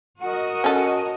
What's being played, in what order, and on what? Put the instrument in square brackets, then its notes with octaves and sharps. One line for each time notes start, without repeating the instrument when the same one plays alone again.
[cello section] F#4 A#4 D#5 [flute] F#5
[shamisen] C#4 A4